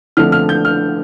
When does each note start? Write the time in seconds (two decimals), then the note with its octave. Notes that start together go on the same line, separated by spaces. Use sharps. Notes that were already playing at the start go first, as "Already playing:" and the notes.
0.17 D3 F3 A3 C4 F6
0.32 F6
0.49 G6
0.65 F6